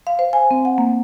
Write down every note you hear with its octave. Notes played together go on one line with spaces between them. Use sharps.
F5
C5
G#5
C4
F#5
A#3